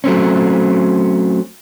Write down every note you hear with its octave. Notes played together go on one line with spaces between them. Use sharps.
F#3 A3 C4 C#4